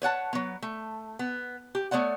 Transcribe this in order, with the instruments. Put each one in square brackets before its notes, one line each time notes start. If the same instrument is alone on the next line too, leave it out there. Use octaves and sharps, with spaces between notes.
[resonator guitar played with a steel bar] B4 C#5 F#5 A5
F#3 B3
A3
B3
G4
A3 B3 C#5 D5 F#5